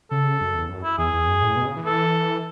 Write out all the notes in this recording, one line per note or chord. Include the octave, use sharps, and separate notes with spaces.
C#3 A4
F#2
E2
F#2
E4
E2 G#4
E2
F#2
A2
B2
C#3
E3
A4